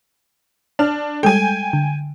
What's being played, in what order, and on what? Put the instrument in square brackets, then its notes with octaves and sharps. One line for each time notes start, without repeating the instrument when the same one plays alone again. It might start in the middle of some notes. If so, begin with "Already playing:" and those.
[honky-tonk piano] D4 [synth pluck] A5 F6
[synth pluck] G3 G#3 A4 [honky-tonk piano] G5 G#5
[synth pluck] D3